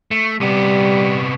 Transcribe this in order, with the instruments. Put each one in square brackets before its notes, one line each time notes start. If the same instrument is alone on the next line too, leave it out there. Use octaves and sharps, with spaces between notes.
[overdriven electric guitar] A3
[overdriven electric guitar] C3 B3 [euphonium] G3